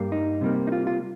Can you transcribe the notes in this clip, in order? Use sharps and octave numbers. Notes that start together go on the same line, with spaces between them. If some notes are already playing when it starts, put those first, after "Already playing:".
Already playing: G2 G3 A#3
D#4
C3 G3 A#3
D#4
F4
F4